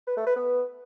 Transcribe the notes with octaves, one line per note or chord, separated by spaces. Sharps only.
B4
A3
B4
B3